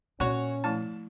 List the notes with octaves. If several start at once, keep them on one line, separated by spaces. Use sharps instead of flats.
A#2 C#4 F#4 C#5
F3 A3 E4 A5